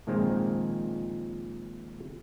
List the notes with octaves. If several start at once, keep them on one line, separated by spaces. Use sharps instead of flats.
A#2 D#3 F3 G#3 A#3 C4